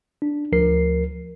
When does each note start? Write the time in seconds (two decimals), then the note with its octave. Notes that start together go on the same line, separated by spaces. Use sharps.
0.22 D4
0.52 D2 F3 A#4 C7